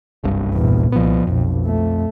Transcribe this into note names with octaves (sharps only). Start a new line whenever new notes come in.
F#1 C2 G2
E2 A#2
C2 F3 B3
B1 F2
A3